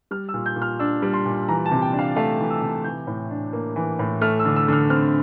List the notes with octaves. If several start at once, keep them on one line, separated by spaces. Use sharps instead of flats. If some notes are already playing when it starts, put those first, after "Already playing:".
G3 F6
E6
A#2
G6
A#2
F6
D4 E6
G3
C6
A#2
E3 A#5
A5
C3
G5
D4
F5
A3 F5
E3
E6
C3
E3 G6
A2
D4
A#3
E3
A2
A3 F6
E6
D3
E6
D3 F6
C4 F6